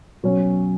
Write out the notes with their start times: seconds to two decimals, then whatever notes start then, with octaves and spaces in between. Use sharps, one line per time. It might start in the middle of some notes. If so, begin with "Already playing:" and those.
0.23 B2 F#3 C#4